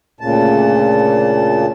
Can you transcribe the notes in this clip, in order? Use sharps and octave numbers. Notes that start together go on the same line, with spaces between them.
D2 A#2 C#3 A5